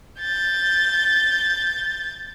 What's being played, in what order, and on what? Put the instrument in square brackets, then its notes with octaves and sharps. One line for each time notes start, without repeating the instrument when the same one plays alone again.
[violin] G6 A6